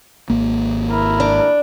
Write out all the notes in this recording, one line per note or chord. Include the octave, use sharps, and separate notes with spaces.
G#1 A#3
E4 A#4
D4